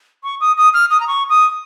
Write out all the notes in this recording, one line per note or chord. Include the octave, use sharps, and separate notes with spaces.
C#6
D#6
D#6
F6
D#6
A#5
C#6
D#6